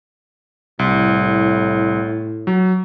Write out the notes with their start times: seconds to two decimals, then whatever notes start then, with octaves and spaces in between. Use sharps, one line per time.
0.79 C2 A2
2.47 F#3